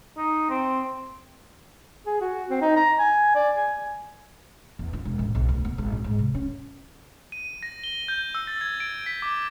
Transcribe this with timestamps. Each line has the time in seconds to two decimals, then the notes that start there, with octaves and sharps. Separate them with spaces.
0.17 D#4
0.50 C4
2.06 G#4
2.21 F#4
2.50 C4
2.61 D#4
2.76 A#5
2.99 G#5
3.35 D5
3.56 G#5
4.79 E2
4.93 F4
5.05 E1
5.19 A1
5.35 B1
5.49 D2
5.65 B3
5.78 G#1
5.92 A#2
6.04 G#2
6.19 C3
6.35 C#4
7.32 D#7
7.63 A#6
7.84 G7
8.08 G6
8.35 E6
8.47 A6
8.61 G#6
8.80 D7
9.06 B6
9.22 D6